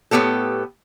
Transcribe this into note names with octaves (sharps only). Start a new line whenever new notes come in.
A2 E3 B3 G4 A4